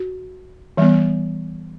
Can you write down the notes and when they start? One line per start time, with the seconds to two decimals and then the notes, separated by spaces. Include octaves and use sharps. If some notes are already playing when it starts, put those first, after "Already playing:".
Already playing: F#4
0.77 E3 G3 B3